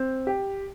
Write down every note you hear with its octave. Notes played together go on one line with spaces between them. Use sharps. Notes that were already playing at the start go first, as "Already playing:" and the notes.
Already playing: C4
G4